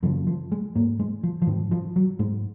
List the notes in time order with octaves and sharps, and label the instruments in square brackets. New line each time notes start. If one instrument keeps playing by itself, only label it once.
[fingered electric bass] F#2 C#3 F3
F3
G#3
G#2 A#3
G#3
F3
F3
G#2 D#3
F3
F#3
G#2 G#3